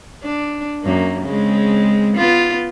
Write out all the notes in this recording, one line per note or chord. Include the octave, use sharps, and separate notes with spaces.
D4
F#2 A#3
C#3 G#3 C4
B3 F4